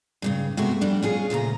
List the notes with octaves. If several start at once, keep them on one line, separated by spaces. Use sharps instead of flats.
G2 A#2 C#3
C3 G#3 A3 B3 F#4
F2 G3 D4
C#4 F4 G#4
D2 A#2 C#3 A#5